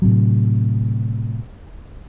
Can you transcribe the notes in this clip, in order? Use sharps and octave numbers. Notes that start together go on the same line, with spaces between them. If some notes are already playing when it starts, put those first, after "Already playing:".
A2 C3 F#3